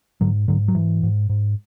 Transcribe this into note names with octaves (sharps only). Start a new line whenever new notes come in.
G#2 D3 F#3
G#2 D3 F#3
F#3
G#2 E3
G#2
G#2